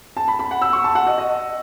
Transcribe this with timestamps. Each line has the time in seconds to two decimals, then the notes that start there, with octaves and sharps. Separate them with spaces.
0.17 A5
0.28 B5
0.39 B5
0.51 F#5
0.62 E6
0.73 C#6
0.84 A5
0.95 F#5
1.07 D#5
1.18 D#5